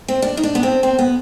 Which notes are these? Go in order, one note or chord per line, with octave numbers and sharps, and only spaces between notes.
C4
D4
D#4
D4
B3
C4
C4
B3